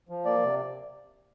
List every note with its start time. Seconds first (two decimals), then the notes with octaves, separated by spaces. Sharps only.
0.09 F3
0.25 A#3 D5
0.43 C3